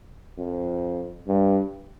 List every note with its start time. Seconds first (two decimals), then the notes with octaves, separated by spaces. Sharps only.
0.38 F2
1.28 G2